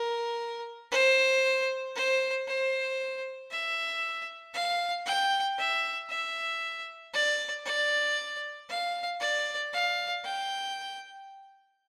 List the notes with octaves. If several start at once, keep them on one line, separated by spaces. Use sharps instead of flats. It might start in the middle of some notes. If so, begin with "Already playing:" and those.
Already playing: A#4
C5
C5
C5
E5
F5
G5
E5
E5
D5
D5
F5
D5
F5
G5